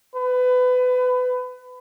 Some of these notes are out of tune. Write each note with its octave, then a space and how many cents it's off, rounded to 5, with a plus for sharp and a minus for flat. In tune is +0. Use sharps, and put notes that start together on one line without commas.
B4 +25